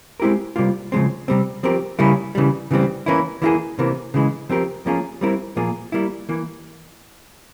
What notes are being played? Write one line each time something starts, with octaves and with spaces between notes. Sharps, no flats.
G#3 C4 E4 G4 A#4
C3 G3 A#3 F4
C#3 F3 G#3 C4
C3 G3 C4
F3 C4 G4 A#4
C#3 G3 A#3 C#4 E4
C#3 E3 G3
C#3 E3 G3 C4
E3 A#3 C#4 E4
E3 A#3 E4 G#4
C3 E3 A#3
C#3 E3 G#3
F3 C4 G4 A#4
F3 A#3 C#4 F4 G#4
G3 C4 E4 A#4
A#2 F3 A#3 F4 G#4
G3 A#3 E4
E3 A#3